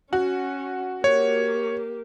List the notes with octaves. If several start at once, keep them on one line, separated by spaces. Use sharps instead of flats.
C#4 F#4
A#3 G4 C#5